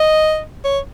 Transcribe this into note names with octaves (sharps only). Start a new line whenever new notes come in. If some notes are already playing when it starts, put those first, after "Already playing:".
Already playing: D#5
C#5